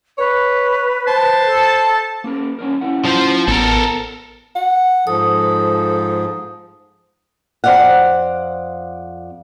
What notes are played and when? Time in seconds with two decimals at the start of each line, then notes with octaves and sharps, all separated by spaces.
0.18 B4 C#5
1.07 C5 A5
1.47 A4
2.24 A#3 C#4 A#4
2.59 C#4 D4 A#4
2.81 C#4 E4 F#5
3.05 F3 C5
3.48 A1 B3 A4 A#4
4.55 F#5
5.07 G#2 F3 A4 D#6
7.64 F2 C5 D5 F5 F#5